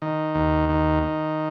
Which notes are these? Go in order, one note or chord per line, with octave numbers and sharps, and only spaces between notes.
D#3
D#2
D#3
D#3